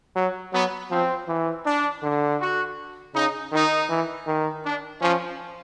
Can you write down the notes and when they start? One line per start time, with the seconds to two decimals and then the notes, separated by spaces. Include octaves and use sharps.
0.16 F#3
0.52 F#3 B3
0.91 F3 C4
1.28 E3
1.65 D4
2.03 D3
2.40 F#4
3.15 C#3 D#4
3.52 D#3 D#4
3.90 E3
4.27 D#3
4.64 D4
5.02 F3 C#4